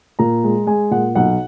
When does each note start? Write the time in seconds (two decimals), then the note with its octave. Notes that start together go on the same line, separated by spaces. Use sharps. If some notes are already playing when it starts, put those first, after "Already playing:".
0.19 A#2 A#5
0.44 G#3
0.67 G#3 G#5
0.91 A#2 F#5
1.15 B1 F#5